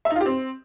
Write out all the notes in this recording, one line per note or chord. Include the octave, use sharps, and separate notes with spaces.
E5
D#4
F4
G4
C4